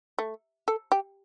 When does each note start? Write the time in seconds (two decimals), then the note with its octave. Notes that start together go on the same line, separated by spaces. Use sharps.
0.19 A3
0.68 A4
0.92 G4